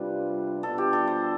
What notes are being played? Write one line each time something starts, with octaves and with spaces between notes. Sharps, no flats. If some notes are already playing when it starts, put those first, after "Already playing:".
Already playing: C3 G3 D4 F4 B4
B2 G3 D4 F4 A4
G4
A4
C5